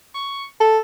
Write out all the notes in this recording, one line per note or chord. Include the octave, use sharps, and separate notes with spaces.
C#6
A4